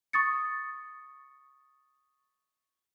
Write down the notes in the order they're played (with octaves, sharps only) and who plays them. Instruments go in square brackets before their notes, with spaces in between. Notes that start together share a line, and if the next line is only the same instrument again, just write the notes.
[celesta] C#6 D#6 A6 C#7